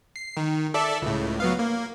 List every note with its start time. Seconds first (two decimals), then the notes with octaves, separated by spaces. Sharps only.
0.16 C7
0.37 D#3
0.74 A4 D5 E5
1.02 C#2 A2
1.40 F#3 B3 F5
1.59 A#3